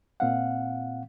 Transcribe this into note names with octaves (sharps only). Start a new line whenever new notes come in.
A#2 C4 F5 F#5